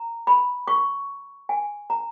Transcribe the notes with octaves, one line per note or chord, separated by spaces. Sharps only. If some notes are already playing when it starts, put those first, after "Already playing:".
Already playing: A#5
B5
C#6
G#5
A#5